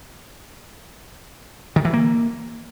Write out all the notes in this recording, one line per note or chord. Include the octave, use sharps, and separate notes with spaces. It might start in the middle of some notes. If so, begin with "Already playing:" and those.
D#3
E3
A#3